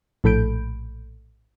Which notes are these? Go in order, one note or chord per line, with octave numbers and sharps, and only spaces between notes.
A#1 A2 A4 B5 G6 D7